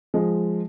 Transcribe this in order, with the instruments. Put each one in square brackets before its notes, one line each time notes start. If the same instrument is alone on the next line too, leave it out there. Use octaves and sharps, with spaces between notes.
[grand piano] F3 G#3